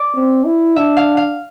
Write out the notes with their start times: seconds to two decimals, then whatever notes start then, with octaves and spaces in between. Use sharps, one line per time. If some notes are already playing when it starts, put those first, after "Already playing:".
Already playing: D5
0.15 C4
0.45 E4
0.76 D4 E5
0.97 F5
1.17 F5